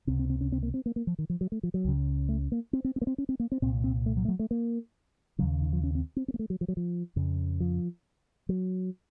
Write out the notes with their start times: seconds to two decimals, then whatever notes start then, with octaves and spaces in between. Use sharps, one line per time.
0.07 C#2 C3 C4
0.19 C4
0.30 C4
0.41 C#4
0.52 C4
0.63 A#3
0.74 C4
0.86 A#3
0.96 A#3
1.07 F3
1.19 D#3
1.30 F3
1.41 F#3
1.52 A3
1.63 F3
1.74 F#3
1.85 C#2 C#3
2.29 A3
2.52 A#3
2.73 C4
2.84 C4
2.96 C4
3.02 A#3
3.07 C4
3.18 C#4
3.29 C4
3.40 A#3
3.52 C4
3.62 C2 A#2 C4
3.84 C4
4.06 A3
4.17 F#3
4.25 A3
4.28 F#3
4.39 A3
4.51 A#3
5.39 C#3 F#3
5.42 D#2
5.62 D#3
5.73 F3
5.83 C#4
5.95 C4
6.17 C4
6.28 C4
6.34 A#3
6.39 A3
6.50 F#3
6.61 F3
6.68 F#3
6.77 F3
7.16 F2 C#3
7.60 F3
8.49 F#3